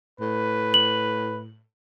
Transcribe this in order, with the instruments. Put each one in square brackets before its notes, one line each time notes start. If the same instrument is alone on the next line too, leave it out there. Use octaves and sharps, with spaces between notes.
[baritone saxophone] A2 [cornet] B4
[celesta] F#7